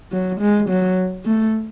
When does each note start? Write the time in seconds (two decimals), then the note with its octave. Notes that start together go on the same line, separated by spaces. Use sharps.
0.12 F#3
0.41 G#3
0.69 F#3
1.26 A3